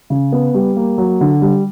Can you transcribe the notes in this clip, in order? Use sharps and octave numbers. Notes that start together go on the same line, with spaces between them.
C#3
B3
G3
A#3
F#3
D3
G3